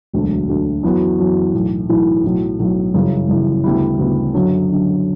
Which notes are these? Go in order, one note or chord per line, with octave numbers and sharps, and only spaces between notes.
E1 D2 D3 F#3
E1 D2 D3 F#3
F#2 E3 B3 F#4
F#2 E3 B3 F#4
B1 A2 E3
B1 A2 E3
B1 A2 F#3
B1 A2 F#3
G1 F#2 C#3 E3
G1 F#2 C#3 E3
D2 C#3 G3 B3 E4
D2 C#3 G3 B3 E4
F#2 D3 F#3
F#2 D3 F#3